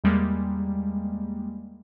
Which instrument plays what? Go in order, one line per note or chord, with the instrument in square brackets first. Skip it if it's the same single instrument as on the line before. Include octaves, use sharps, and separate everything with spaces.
[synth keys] E2 G3 G#3 A#3